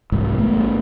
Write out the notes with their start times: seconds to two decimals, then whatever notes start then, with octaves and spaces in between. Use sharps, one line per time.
0.12 C2 G#2 E3
0.38 A1 A3 B3